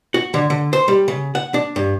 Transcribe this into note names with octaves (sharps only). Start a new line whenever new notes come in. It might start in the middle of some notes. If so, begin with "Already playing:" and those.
F#4
D3
D3
C5
G3
C#3
F#5
D4
G2